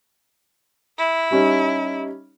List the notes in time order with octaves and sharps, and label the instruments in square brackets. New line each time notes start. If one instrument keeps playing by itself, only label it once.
[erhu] E4
[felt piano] G3 C#4 D#4